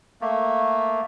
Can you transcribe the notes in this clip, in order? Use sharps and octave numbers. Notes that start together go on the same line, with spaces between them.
A3 A#3